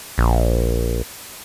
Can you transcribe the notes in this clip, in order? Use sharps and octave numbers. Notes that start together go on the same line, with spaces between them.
A#1